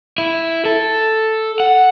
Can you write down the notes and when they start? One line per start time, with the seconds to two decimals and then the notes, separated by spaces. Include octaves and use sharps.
0.18 E4
0.65 A4
1.60 F#5